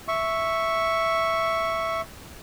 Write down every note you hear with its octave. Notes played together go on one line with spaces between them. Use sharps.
E5 C#6